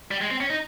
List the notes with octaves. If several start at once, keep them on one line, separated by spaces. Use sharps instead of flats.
G3
G#3
C4
C#4
D#4